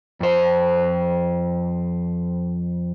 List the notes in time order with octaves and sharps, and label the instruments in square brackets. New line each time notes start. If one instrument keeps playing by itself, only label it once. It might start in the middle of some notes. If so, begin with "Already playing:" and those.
[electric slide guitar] F2 C5